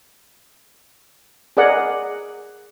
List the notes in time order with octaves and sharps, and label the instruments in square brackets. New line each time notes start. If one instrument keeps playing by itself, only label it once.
[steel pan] G#4 A#4 D5 D#5 F#5 G#5